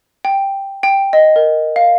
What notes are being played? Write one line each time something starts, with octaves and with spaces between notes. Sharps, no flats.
G5
G5
D#5
A#4
F5